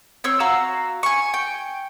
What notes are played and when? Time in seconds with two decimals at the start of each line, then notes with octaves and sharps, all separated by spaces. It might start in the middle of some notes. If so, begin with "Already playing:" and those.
0.24 C4 C#5 E6
0.40 F#4 F5 A#5 E6
1.03 G#5 C#6
1.34 G5